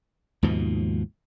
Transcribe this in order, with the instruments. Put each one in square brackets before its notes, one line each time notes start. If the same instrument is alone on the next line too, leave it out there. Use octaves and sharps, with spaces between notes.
[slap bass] D#2 G#2 B2 F3